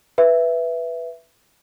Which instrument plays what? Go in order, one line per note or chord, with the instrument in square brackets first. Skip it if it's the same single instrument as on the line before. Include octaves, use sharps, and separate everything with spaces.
[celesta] B4 E5